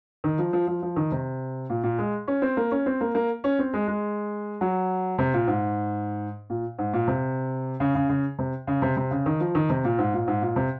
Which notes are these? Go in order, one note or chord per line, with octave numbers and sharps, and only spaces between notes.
D#3
F3
F3
F3
F3
D#3
C3
A#2
A#2
G#3
C#4
C4
A#3
C#4
C4
A#3
A#3
C#4
C4
G#3
G#3
F#3
C3
A#2
G#2
A#2
G#2
A#2
C3
C#3
C#3
C#3
C3
C#3
C3
C3
C#3
D#3
F3
D#3
C3
A#2
G#2
A#2
G#2
A#2
C3